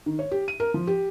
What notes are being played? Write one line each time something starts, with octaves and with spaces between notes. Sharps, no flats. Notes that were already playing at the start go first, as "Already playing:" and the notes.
D#3
C#5
G4
D#7
A#4
F3
G4